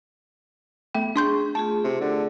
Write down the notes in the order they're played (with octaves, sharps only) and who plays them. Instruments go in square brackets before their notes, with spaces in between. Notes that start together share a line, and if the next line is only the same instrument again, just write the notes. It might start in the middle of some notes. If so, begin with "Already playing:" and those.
[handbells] A3 G5 [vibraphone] B3
[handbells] D4 C6 G6 [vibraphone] G#4 C#6
[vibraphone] A3 F4 G#4 [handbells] A5
[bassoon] C3
D3